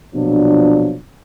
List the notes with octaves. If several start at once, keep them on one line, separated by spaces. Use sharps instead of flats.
A#1 B2 F3 F#3 D4